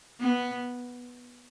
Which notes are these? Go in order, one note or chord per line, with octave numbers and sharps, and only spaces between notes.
B3